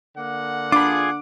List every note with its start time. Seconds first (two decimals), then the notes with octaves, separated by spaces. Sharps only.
0.16 D3 A#3 F#5
0.72 D4 F4 G#4 B5 D6